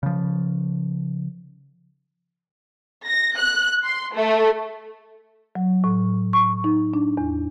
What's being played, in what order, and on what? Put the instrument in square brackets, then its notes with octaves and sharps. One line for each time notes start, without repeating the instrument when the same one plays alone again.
[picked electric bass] C#3 F3
[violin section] A#6
F#6
C6
A3
[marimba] F#3
A2
C#6
D#4
D4
E2